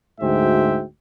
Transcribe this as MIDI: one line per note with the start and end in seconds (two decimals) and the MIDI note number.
0.21 0.83 38
0.21 0.83 44
0.21 0.83 66
0.21 0.83 72
0.21 0.83 76
0.21 0.83 79